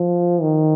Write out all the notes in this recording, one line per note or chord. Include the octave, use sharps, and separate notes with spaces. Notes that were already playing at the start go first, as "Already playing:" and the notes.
Already playing: F3
D#3